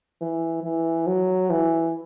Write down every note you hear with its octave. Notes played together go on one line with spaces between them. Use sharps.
E3
E3
F#3
E3